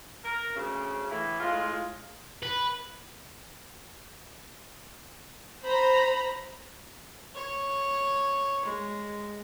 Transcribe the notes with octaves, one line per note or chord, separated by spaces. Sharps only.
A#4
D2 C#3
A2 E3
A2 G#3 F4
B4
C5 A#5 B5
C#5
G#3